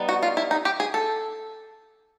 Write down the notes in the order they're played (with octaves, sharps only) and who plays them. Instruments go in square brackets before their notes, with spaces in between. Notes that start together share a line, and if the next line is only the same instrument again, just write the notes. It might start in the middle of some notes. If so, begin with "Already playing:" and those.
Already playing: [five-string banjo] G3 B3 D#4
F#4
F4
E4
D#4
G4
G#4
A4